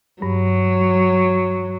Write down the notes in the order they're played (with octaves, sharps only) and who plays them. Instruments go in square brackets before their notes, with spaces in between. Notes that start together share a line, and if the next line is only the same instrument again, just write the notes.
[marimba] G2 [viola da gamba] F#3